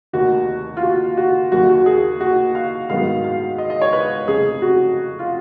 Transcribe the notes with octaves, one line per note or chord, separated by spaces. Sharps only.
F1 D#2 D#3 F#4
F4
F#4
F#4
D#2 D#3 F#3 A#3 F#4
F#4
G#4
F#4
F5
G#2 D#3 F#3 B3 F5
F5
D#5
D#5
C#5
B4
F1 F2 C#3 G#4
F#4
F4